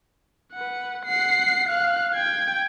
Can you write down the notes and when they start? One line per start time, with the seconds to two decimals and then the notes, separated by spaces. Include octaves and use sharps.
0.53 B4 F#5
1.05 F#5 C7
1.69 F5 F#6
2.14 G5 G#6